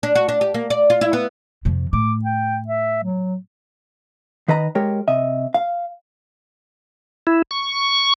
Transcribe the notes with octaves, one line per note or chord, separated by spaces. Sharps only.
D4
F#4
D4
G4
A#3
D5
F4
E4
B3
F2 C3
A2 D6
G5
E5
F#3
D#3 B4 D#5 A#5 B5
G#3 G4 A#4 C#5
C3 D#5 E5
F5
E4
C#6